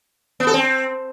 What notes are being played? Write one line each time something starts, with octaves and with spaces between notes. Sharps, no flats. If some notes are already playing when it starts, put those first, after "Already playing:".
B3
A4
C4